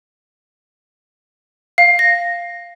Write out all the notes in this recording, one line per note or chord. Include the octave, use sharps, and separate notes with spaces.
F5
A#6